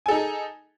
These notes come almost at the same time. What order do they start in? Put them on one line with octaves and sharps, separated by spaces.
G#5 A4 D#4 G#4